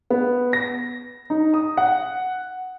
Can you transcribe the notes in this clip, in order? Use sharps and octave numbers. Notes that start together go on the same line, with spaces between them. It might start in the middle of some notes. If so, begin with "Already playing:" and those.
B3
A#6
D#4
D#6
F#5